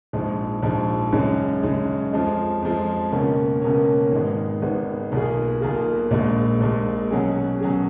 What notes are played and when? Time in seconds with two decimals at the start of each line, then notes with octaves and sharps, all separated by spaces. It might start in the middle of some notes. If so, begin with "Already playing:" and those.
0.13 A#1 G#2 F3 G#3
0.63 A#1 G#2 F3 G#3
1.13 F#2 C#3 G#3
1.63 F#2 C#3 G#3
2.13 F2 F3 G#3
2.62 F2 F3 G#3
3.12 C#2 B2 A#3 C#4
3.62 C#2 B2 A#3 C#4
4.12 G#1 G#2 D#3 G#3 B3
4.61 G#1 G#2 D#3 G#3 B3
5.12 B1 B2 A#3 F4 G#4
5.61 B1 B2 A#3 F4 G#4
6.11 A#1 A#2 G#3
6.61 A#1 A#2 G#3
7.11 B2 F#3 C#4 G#4
7.60 B2 F#3 C#4 G#4